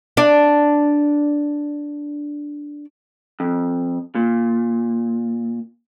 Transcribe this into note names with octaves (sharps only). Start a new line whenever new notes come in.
D4 D5
F2
A#2